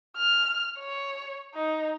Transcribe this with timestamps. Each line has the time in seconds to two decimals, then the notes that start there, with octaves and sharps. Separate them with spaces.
0.17 F6
0.79 C#5
1.54 D#4